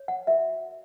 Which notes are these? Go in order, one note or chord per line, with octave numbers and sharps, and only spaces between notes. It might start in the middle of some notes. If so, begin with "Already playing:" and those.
Already playing: C#5
F#5
F#4 A#4 E5